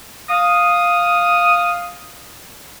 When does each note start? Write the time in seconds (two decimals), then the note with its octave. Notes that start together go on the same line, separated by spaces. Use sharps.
0.29 F5 D#6